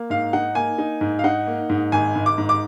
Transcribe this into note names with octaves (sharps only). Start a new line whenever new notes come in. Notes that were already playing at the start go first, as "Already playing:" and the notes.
Already playing: A#3
G#2 F5
D#4 F#5
A#3 G#5
D#4
G#2
F5
D#4 F#5
A#3
G#2
G#1 G#5
G#1
D6
G#2
D6